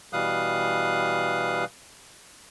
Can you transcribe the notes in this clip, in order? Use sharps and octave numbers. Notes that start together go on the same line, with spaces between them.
B2 E3 G3 F5 D#6 F#6